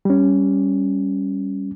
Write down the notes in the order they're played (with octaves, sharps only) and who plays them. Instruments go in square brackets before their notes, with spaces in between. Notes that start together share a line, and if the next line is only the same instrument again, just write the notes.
[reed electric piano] G3 C#4